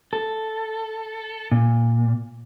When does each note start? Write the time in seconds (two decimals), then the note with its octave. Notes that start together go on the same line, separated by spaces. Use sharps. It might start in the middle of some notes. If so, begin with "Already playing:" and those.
0.13 A4
1.52 A#2